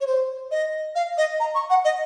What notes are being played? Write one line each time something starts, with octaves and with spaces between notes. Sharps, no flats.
C#5
C5
D#5
F5
D#5
A#5
C#6
F#5
D#5